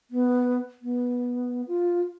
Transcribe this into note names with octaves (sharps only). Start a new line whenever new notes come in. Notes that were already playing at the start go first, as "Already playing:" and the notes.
B3
B3
F4